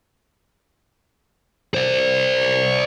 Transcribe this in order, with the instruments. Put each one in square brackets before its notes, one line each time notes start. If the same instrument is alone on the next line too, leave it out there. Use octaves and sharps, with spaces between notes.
[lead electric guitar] C5 D5